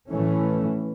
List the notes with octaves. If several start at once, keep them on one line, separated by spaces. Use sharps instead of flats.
A2 E3 A3 C#4